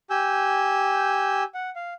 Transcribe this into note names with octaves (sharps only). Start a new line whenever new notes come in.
G4 G#5 E6 G6
F#5
F5